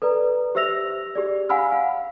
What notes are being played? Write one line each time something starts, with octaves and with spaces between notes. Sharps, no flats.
A4 B4 D5 A#5
G4 C5 E5 E6 A#6 F7
G4 G#4 D5
F5 F#5 G#5 B5 E6 F6
F5